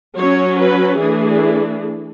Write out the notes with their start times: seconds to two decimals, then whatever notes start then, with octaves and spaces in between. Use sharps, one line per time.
0.17 F#3 C#4 C#5
0.59 B4
0.99 E3 A3 D4 G#4